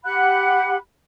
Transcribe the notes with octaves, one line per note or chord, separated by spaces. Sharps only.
G4 F#5 B5 F#6